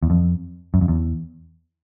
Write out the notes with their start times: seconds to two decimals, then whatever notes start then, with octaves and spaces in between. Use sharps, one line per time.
0.03 E2
0.10 F2
0.74 F#2
0.81 F2
0.88 E2